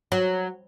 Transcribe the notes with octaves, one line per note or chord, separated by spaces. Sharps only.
F#3